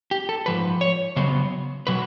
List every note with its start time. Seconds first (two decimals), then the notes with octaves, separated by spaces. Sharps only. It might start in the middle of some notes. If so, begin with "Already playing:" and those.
0.11 G4
0.29 A4
0.46 G#2 F3 B4
0.81 C#5
1.16 C#3 F#3 B3 C5
1.87 B2 F#3 B4